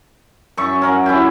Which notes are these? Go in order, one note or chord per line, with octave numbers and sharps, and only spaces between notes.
F#2 E5 C#6
C#4 A#4 F#5
C#4 E4 F#4 G4